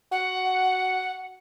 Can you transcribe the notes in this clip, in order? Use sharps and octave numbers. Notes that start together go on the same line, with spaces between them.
F#4 F#5